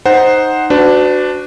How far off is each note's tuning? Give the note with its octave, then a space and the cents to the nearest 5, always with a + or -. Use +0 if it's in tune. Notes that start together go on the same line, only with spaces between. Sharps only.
D#4 +0 C5 +0 F#5 +5
D4 +0 F#4 +0 B4 +45